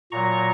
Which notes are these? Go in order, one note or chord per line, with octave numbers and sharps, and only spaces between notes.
A#2 F#3 A#5 C#6